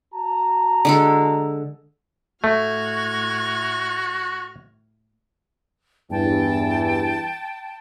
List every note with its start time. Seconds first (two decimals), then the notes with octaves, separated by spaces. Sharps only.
0.14 F#4 A5 A#5
0.85 D3 G#3 A4
2.44 A2 A3 F#4 F6 G#6
6.11 E2 G2 E3 G5 A5